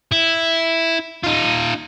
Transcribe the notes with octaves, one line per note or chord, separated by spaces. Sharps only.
E4
D#4 F4